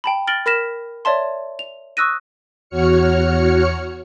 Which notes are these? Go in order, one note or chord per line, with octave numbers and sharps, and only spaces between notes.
G5 A5 B5
F6 A6 A#6 D7 F#7 G7
A#4 B5 F6 A#6 B6 E7
C#5 D5 E5 A5 C6
F7
C#6 D#6 E6 F#6 A#6 D#7
E2 F#4 C#5 F6 C#7